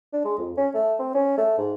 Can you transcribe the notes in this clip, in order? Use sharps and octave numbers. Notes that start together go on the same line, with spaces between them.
D4
G#3
F2
C#4
A3
C4
C#4
A3
G#2